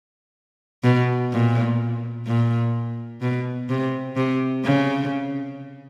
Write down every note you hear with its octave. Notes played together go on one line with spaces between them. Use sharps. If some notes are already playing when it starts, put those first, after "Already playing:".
B2
A#2
A#2
B2
C3
C3
C#3